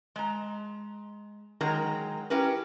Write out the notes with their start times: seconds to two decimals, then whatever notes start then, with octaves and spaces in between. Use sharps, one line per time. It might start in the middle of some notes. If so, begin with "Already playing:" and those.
0.16 G#3 A#5
1.61 D#3 F#3 G#3 A#4 A#5
2.30 C#4 E4 G4 A#4 B4